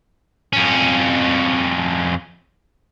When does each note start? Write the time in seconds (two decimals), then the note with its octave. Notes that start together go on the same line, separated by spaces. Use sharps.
0.53 F2 C#4